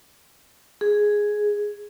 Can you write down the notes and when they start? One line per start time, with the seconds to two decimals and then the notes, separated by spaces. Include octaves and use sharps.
0.81 G#4